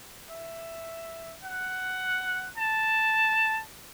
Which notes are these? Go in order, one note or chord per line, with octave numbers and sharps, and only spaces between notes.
E5
F#5
A5